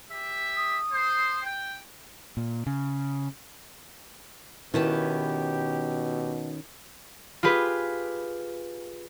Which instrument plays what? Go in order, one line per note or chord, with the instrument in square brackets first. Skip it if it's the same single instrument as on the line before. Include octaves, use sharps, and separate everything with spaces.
[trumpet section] G4 E5
[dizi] D#6
[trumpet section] C5
G5
[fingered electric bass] A#2
C#3
[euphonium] B2 [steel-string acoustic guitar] D#3 C#4 [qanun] E4 B4 A5 [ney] G4
[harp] F4 G4 G#4 B4